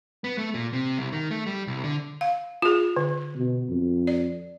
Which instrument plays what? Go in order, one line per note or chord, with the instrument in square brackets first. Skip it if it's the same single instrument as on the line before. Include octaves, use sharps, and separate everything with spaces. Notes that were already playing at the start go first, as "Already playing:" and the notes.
[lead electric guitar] B3
A3
A#2
C3
C2
D#3
A3
G3
C2
D3
[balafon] F5
F4 G#4
D3
[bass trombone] B2
F2
[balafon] D5